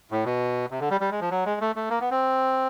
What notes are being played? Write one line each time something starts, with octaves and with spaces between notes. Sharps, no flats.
A2
B2
C3
D3
G3
G3
G#3
F3
F#3
G#3
A3
A3
A#3
B3
C4